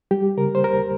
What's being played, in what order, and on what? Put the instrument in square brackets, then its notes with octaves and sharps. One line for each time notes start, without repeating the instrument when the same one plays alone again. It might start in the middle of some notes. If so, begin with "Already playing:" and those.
[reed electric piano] G3 G4
C#3 A#4
C5
D#2 A#4